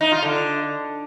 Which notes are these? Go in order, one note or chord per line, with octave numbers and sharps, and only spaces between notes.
D#4
F4
D3